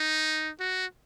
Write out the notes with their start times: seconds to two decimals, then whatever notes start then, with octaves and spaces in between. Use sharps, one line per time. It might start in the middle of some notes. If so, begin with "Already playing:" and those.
Already playing: D#4
0.60 F#4